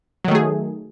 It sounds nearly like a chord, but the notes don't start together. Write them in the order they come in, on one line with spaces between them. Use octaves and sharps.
F#3 D#3 A3 G#4